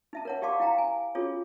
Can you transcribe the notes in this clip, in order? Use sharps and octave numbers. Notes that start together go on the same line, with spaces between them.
D#4 E5 A5
A#4 C#5 F#5
G4 D5 F5 A5 C6 D6
E4 F5 G5 A#5
G#5
C#4 F4 F#4 G#4 A4 C#5